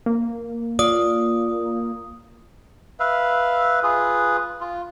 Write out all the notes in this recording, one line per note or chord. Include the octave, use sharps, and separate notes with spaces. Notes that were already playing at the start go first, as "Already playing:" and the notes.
A#3
F4 D5 D#6
B4 E5 F5
F4 G#4 B4
F4